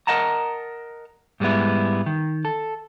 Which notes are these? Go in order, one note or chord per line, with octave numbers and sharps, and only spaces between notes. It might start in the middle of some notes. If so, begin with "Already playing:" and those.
A#4 C5 D#5 F#5 A5 A#5
G#2 G3 G#3 B3 E4
D#3
A4